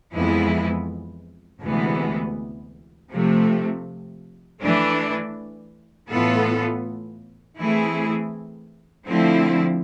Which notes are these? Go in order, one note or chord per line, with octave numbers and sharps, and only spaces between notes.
F2 E3 G#3 B3 E4
D2 C3 E3 G#3 B3
C3 F3 A3
E3 A3 D4
A2 E3 B3 F4 A4
E3 A3 C4 E4 G#4
D3 F3 A3 C4 E4